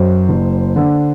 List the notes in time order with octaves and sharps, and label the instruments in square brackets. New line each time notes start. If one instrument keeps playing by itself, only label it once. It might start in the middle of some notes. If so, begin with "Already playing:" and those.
Already playing: [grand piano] F#2 C5
F#1
D3